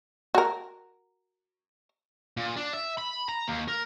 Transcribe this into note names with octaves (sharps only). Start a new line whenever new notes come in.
F#4 A#4
A#2
D4
E5
B5
A#5
D#2
A#4